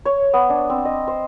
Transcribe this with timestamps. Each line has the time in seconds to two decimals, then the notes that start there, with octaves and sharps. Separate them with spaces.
0.05 C#5
0.34 B3
0.49 D4
0.70 C4
0.85 D#5
1.08 C5